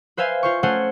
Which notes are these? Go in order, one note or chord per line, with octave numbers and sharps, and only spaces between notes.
B4 C5 E5 F5 G#5
F4 C5 C#6
A3 C#4 C5 F#5 G#5